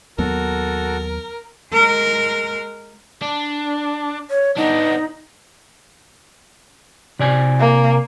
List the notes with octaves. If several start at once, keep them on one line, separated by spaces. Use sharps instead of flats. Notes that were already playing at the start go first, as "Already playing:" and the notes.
D#2 F#3 B3 F#4 A4 A#4
G#3 A#4
D4
C#5
B3 D4 D#4
C3 D5 G#5
A#3